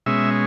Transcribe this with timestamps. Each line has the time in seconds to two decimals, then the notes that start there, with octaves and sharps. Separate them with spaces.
0.06 B2 G#3 C#4 E5